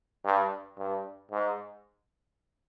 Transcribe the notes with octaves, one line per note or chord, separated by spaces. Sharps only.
G2
G2
G#2